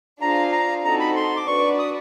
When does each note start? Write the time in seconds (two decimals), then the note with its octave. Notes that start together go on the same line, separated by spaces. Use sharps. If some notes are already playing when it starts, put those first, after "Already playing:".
0.21 D4 F4 G#4 C5 F5 A#5
0.52 A#5
0.84 C4 D#4 F#4 A4 A#5
1.00 B5
1.16 C6
1.37 D6
1.47 D4 F#4 B4 D5 C#6
1.79 D#6